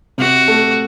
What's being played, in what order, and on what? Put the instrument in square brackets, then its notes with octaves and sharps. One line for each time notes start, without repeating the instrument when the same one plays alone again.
[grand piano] C3 [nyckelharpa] F#4
[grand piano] A3